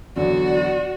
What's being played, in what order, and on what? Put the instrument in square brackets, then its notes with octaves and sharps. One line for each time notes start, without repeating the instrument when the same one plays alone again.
[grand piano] E2 D3 F#3 [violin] F#4 [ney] D5